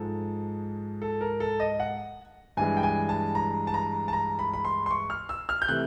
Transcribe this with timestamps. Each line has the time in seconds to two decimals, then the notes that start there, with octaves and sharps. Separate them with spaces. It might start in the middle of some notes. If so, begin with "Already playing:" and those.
Already playing: G#2 F3 G#3 A4
1.02 A4
1.21 A#4
1.40 A4
1.60 D#5
1.80 F#5
2.57 G2 E3 G#3 G#5
2.77 G5
2.83 G#5
3.09 A5
3.35 A#5
3.67 A5
3.74 A#5
4.08 A5
4.13 A#5
4.39 B5
4.53 B5
4.65 C6
4.86 C6
4.91 C#6
5.10 F6
5.29 E6
5.49 F6
5.62 G6
5.68 C3 E3 A3 F#6